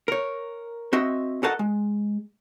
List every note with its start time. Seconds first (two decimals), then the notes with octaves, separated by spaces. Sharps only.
0.08 A#4 C#5
0.93 C4 F#4 D#5 E5
1.43 F#4 A4 A#4 D#5 F#5 A5
1.59 G#3